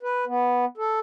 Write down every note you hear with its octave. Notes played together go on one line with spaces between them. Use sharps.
B4
B3
A4